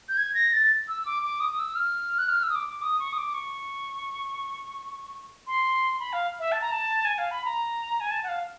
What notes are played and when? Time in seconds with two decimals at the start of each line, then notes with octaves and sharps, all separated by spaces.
0.09 G6
0.17 G#6
0.35 A#6
0.53 A6
0.88 E6
1.06 D6
1.23 D6
1.40 D#6
1.51 D#6
1.59 E6
1.76 F6
2.18 F#6
2.29 F6
2.43 E6
2.50 D#6
2.55 D6
2.69 D6
2.82 D#6
3.00 C#6
3.13 D#6
3.18 D6
3.34 C#6
5.47 C6
5.99 B5
6.13 F5
6.40 E5
6.52 A5
6.61 A#5
6.71 A5
7.05 G#5
7.18 F5
7.31 B5
7.45 A#5
8.00 G#5
8.11 A5
8.23 F#5
8.29 F5